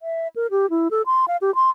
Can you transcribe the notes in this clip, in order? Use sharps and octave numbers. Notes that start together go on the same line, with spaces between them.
E5
A#4
G4
E4
A4
C6
F5
G4
C6